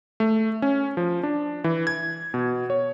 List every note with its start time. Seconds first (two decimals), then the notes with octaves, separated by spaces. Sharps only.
0.20 A3
0.62 C#4
0.97 F3
1.23 D4
1.64 E3
1.87 G#6
2.34 B2
2.70 C#5